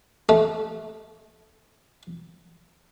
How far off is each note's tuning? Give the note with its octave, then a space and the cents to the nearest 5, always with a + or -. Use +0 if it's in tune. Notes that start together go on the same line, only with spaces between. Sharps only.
A3 -20